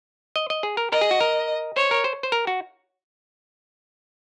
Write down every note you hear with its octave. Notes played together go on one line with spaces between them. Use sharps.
D#5
D#5
G#4
A#4
A#4 D#5
G#4
F#4
A#4
C5 C#5
A#4
C5
C5
A#4
F#4